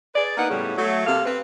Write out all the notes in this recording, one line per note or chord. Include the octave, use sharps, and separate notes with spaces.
G#4 B4 D5
A#3 B3 D#4 F#5
A2 C#3 G3 B3
F#3 A3
C3 A#3 A4 F5
C4 B4